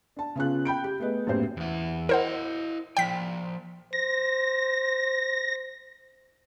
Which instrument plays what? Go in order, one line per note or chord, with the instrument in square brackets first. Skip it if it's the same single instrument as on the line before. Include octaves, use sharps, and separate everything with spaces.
[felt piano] D4 A5
C#3 B3 C#4 F4 G#4 F#6
G5 B5 G6 D7
G4
A3 B3 G#4 B4 D#5
A#1 F#2 A2 B3 G4 C5
[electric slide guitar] E2 E4
[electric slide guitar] E4 D#5 [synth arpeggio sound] A#4 C5 F#5
[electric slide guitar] F3 D5 [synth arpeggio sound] G5 B6
[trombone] C5 [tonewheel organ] A#6